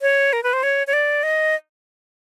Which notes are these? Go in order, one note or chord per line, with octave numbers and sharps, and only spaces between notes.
C#5
A#4
B4
C5
C#5
C#5
D5
D#5